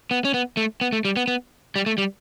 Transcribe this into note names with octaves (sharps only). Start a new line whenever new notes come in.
B3
C#4
B3
A3
B3
A3
G3
B3
B3
G3
A3
G3